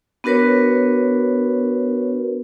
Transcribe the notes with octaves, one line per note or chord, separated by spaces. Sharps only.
B3 D4 F#4 A#4 B4 C#5